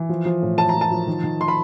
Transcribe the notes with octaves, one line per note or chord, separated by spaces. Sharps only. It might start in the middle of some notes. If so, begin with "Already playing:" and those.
Already playing: E3
F3
F3
A2
A2 A5
A#5
F3
A5
F3
D#3
D#3
C6
B5